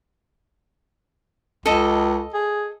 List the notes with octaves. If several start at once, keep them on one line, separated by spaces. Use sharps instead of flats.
C#2 A4 D#5
G#4